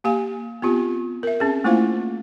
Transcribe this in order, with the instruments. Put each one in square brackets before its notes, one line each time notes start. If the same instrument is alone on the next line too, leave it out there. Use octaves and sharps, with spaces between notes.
[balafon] A#3 G4 F5 G#5
B3 C4 F4 G4
A#4 E5
C4 C#4 G#4
A3 A#3 E4 F4 C5 F5